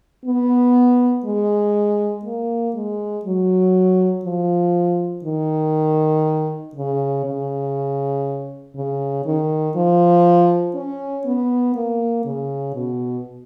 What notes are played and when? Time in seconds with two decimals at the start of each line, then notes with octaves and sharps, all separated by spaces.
0.25 B3
1.25 G#3
2.25 A#3
2.75 G#3
3.25 F#3
4.25 F3
5.25 D#3
6.75 C#3
7.25 C#3
8.76 C#3
9.25 D#3
9.76 F3
10.75 C#4
11.26 B3
11.76 A#3
12.25 C#3
12.75 B2